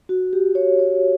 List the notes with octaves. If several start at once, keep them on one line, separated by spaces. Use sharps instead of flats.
F#4
G4
C#5
C#5